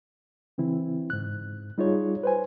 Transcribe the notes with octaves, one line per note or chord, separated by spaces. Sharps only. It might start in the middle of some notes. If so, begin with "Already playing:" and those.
C#3 E3 C4 E4
G#2 F#6
G3 D#4 F4 G#4 C#5
B4 C5 G#5